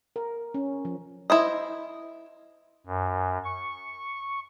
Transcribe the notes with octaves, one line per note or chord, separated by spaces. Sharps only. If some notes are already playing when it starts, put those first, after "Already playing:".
A#4
C#4
F3
E4 C5 D#5
F#2
C#6